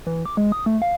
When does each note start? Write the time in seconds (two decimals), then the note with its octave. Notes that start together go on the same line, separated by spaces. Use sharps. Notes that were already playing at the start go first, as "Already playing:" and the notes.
0.07 E3
0.26 D6
0.37 G#3
0.52 D#6
0.66 A3
0.82 F5